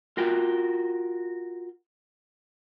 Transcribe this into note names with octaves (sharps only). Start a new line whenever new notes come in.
F4 F#4 A#4 G5